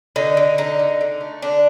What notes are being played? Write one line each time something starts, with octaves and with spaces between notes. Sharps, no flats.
D3 D#4
D3
D3 D#4
D3
D3
A3
D3 D4